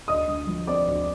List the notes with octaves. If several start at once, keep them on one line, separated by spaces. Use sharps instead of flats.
D2 D#5 D#6
D3
F3
C4 D5 D6
D2